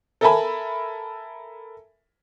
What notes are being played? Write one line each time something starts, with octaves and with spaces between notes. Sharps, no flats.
A4 A#4 E5 G#5 A5 B5